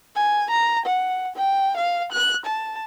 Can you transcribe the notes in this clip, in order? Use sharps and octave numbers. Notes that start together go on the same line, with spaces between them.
G#5
A#5
F#5
G5
F5
F#6
A5